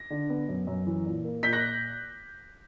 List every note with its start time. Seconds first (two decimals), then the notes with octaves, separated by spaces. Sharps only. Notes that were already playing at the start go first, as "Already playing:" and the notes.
Already playing: A#6
0.10 D3
0.30 B3
0.48 F#2
0.67 F#2
0.87 E3
1.05 A#2
1.25 A#3
1.43 A#2 G6 B6
1.53 F#6 A#6